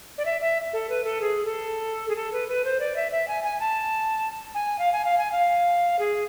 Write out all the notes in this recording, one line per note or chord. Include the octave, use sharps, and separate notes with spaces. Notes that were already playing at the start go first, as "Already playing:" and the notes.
D5
E5
E5
A4
B4
A4
G#4
A4
G#4
A4
B4
B4
C5
D5
E5
E5
G#5
G#5
A5
G#5
F5
G#5
F5
G#5
F5
G#4